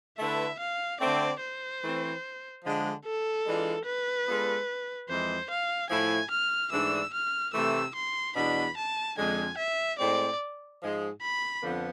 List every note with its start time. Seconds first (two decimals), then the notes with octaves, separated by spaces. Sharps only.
0.18 D3 A3 E4 B4 E5
0.60 F5
1.00 D3 A3 C4 D5
1.41 C5
1.82 E3 A3 C4
2.63 D3 F3 G#3 D4
3.05 A4
3.45 E3 G#3 D4 F4
3.86 B4
4.27 G#3 B3 D4 F4 A4
5.09 F2 E3 G#3 C5
5.50 F5
5.90 A2 F3 A3 E4 G#5
6.31 F6
6.72 G#2 E3 A3 D4 E6
7.14 F6
7.54 C3 E3 A3 E6
7.95 C6
8.35 E2 B2 B3 D4 B5
8.77 A5
9.18 F2 D3 G#3 G#5
9.58 E5
9.98 A2 G#3 C4 D5
10.81 G#2 F3 G#3
11.22 B5
11.63 F2 D3 F3 B3